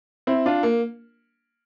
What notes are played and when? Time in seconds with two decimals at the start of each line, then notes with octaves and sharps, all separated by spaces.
0.27 C4 E4
0.46 D4 F4
0.63 A#3